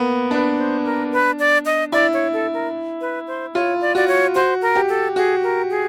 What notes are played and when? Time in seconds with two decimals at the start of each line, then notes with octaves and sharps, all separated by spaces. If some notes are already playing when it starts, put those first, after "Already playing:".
Already playing: A#3 B3
0.31 D4 B4
0.58 C5
0.85 A#4
1.12 B4
1.39 D5
1.66 D#5
1.92 E4 D5
2.14 C#5
2.33 A4
2.54 A#4
3.01 B4
3.27 C5
3.55 F4 C#5
3.81 D5
3.95 F#4 D5
4.08 C#5
4.35 F#4 C5
4.62 A#4
4.75 G4
4.89 A4
5.16 F#4 G#4
5.43 A#4
5.70 G#4